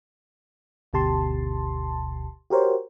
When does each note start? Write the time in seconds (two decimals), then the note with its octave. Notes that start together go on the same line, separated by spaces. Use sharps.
0.93 G1 D2 B2 G4 A5 C6
2.50 F#4 G4 A#4 C5 C#5